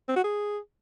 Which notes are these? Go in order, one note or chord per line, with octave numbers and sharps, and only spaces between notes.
C4
F#4
G#4